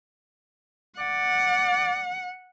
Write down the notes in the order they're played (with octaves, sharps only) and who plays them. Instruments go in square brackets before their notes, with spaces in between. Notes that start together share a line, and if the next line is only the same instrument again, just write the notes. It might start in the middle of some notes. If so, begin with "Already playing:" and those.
[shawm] D5 [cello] F#5